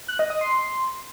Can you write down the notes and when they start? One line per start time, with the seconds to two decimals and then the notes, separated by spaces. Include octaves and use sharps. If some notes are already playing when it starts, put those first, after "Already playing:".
0.08 F#6
0.19 D#5
0.30 D#6
0.41 C6